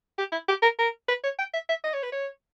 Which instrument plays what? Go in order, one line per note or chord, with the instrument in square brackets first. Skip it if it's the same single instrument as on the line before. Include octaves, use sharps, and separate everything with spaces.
[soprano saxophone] G4
E4
G4
A#4
A#4
B4
C#5
G5
E5
E5
D#5
C#5
B4
C#5